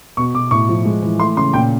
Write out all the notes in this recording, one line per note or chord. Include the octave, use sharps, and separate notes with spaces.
B2 C#6
B2 D6
A2 C#6
F3
G#3
E3
A3 C6
C#3 C6
A#2 G5